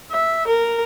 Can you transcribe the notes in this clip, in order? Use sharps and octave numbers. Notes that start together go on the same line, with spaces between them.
E5
A#4